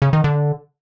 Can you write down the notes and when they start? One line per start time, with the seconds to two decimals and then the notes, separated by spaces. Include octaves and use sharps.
0.02 C#3
0.13 D#3
0.24 D3